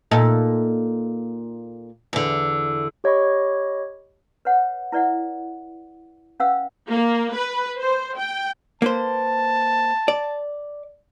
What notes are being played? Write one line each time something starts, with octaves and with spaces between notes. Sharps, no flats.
A#2 D#4 A4
E2 D3
G4 C#5 D#5 B5 C#6
B4 C#5 F#5
E4 B4 D5 E5 F#5
C#4 B4 F5 F#5 E6
A#3
B4
C5
G5
A#3 B4 C5 A5
D5